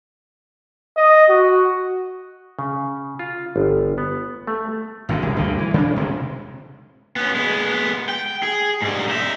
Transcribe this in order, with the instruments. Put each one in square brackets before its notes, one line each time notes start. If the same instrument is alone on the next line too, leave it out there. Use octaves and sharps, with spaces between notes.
[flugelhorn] D#5
F#4
[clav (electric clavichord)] C#3
F4
G1
B3
A3
[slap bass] G#1 A#2 D3
E1 C2 C#3 G3
D2 G2 A#2 D3
E3
C#3 B3 D4
D#1 C3 D#3 G#3
[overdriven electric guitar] B3 C#4
G#3 B3
G5
G#4
G#2 G3
D#4 E5